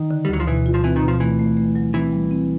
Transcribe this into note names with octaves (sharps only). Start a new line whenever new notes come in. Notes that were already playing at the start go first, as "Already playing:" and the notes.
Already playing: D#3
D3
G3
D2 F#3
F3
B2 E3
F4
F3
E3 C4
D#3
B2
F3
E3 A3
A3
A3
F#3
E3 C4
G3
C4